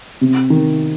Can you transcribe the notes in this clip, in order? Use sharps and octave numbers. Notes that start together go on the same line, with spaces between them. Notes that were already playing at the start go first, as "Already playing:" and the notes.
C3
D#3